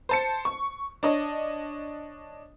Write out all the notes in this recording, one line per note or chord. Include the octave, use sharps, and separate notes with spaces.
C5 A5 C#7
C#6
D4 C#5 D#5